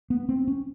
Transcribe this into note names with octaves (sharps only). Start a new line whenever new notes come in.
B3
C4
C#4